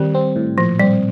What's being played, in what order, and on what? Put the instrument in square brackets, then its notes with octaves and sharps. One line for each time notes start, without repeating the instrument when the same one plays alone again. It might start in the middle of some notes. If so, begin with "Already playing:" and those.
Already playing: [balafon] D#3 [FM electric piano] G3 C4
[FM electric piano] C4
A2
[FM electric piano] A#2 [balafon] F3
[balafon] G3 [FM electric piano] C4